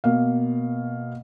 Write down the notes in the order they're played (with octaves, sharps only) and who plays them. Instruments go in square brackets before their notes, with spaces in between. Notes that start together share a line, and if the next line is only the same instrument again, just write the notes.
[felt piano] B2 A#3 F5